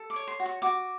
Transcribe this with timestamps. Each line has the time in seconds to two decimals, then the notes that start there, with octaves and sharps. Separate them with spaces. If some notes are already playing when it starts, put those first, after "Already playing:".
Already playing: A4
0.10 D6
0.16 C#5
0.27 C6
0.40 F#4
0.46 C#6
0.62 F#4 D6